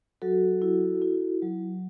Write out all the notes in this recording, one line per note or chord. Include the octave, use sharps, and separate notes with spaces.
F#3 F#4 A4
E4
E4
F#3